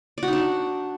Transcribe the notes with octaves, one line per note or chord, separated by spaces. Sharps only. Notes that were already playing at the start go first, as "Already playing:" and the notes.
D5
F#4
D#4
D4